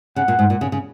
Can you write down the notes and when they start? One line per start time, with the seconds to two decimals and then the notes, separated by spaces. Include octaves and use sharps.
0.16 C#3 F#5
0.28 A#2
0.39 G#2
0.50 A#2
0.61 C#3
0.72 C#3